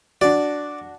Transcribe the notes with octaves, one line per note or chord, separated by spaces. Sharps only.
D4 F#4 D5